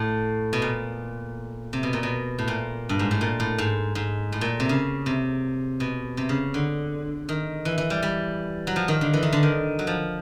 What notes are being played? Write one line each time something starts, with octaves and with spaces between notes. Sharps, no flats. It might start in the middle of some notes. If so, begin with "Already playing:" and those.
Already playing: A2
B2
A#2
C3
B2
A#2
B2
A2
A#2
G2
G#2
A2
A#2
A2
G#2
G#2
A2
A#2
C3
C#3
C3
B2
C3
C#3
D3
D#3
E3
E3
G3
G3
F#3
F3
D#3
D3
E3
D#3
D3
D#3
F#3
F3